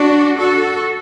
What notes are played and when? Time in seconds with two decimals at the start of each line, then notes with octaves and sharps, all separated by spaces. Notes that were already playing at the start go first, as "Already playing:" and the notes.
Already playing: D4 F#4
0.38 F#4 A4